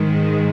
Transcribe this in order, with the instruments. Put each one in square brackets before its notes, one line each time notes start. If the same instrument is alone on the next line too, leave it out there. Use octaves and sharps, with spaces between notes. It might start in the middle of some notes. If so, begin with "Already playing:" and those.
Already playing: [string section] G#2 D#3 G#3